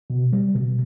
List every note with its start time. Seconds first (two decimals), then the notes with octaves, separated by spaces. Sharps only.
0.10 B2
0.33 G3
0.55 B2